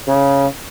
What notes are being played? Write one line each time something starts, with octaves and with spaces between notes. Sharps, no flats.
C#3